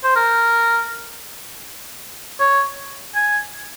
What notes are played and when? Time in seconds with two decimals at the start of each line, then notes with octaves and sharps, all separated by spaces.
0.04 C5
0.16 A#4
2.40 C#5
3.15 G#5